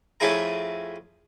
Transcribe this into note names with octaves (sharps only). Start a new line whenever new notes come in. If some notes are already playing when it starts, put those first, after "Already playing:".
F2 A3 C#4 E4 G#4 A#5